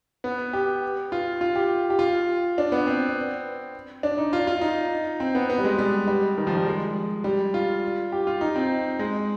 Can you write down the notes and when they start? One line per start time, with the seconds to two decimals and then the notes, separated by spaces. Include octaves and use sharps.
0.24 B3
0.53 G4
1.12 F4
1.41 F4
1.56 G4
1.90 G4
1.99 F4
2.58 D4
2.72 B3
2.87 C4
4.03 D4
4.18 D#4
4.33 F4
4.47 F4
4.61 D#4
5.20 C4
5.35 B3
5.50 B3
5.58 G3
5.64 G#3
5.78 G3
6.08 G3
6.38 D#3
6.47 F3
6.57 G3
6.66 G#3
7.24 G3
7.54 F4
8.12 G4
8.27 F4
8.41 D#4
8.56 C4
8.99 G#3